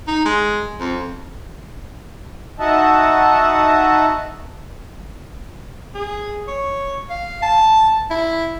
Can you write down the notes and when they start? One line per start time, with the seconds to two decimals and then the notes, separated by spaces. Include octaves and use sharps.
0.08 D#4
0.25 G#3
0.80 F2
2.60 D#4 F#4 D#5 E5 F#5 A5
5.95 G#4
6.48 C#5
7.10 F5
7.42 A5
8.10 E4